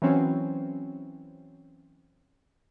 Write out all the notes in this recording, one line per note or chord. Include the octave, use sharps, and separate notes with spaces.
E3 F#3 C4 C#4